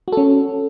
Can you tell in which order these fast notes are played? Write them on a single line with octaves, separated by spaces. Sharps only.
F#4 A4 C#4